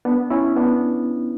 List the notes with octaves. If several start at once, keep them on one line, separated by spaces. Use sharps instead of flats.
B3 D4
C#4 E4
B3 D4